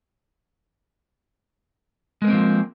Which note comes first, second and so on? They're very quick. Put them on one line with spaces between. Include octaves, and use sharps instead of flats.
G#3 A#4 C4 A#3 F3